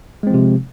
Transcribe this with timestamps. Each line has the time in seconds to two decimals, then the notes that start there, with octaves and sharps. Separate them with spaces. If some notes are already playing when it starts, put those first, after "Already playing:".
0.23 G#3
0.27 C4
0.30 F3
0.34 C3